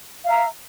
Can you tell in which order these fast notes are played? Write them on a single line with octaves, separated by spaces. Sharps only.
F5 E5 A#5